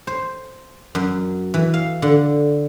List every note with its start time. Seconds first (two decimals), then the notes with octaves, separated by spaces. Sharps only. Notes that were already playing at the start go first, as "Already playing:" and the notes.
0.07 C5
0.95 F#2
1.54 E3
1.74 F5
2.02 D3